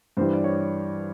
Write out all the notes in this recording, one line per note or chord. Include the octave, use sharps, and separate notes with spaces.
G2 E3 G3 C5
D5
C#5